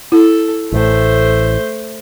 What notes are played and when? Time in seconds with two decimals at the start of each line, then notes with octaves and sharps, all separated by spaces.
0.12 E4 A4
0.72 A1 A2 A3 C5